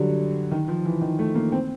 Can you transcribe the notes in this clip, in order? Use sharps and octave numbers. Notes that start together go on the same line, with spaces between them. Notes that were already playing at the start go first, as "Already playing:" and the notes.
Already playing: D3 F#3 G3
D#3
F3
E3
D#3
A3
A#3
C4